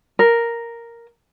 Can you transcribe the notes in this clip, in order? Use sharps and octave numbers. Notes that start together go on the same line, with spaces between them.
A#4